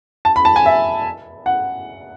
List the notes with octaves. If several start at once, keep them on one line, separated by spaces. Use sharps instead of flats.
A5
B5
A5
G#5
E5
F#5